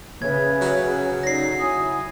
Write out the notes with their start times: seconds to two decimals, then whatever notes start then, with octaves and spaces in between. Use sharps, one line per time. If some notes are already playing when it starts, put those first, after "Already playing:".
0.22 C#3 B4 C#5 E5 G#6
0.61 F#3
1.23 D#4 A4 D5 A#6 C7
1.58 E4 G#5 D#6